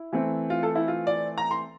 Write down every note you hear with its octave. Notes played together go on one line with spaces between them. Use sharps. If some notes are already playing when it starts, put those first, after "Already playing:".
Already playing: E4
E3 A3 C4
F4
A4
E4
F4
D5
A#5
C6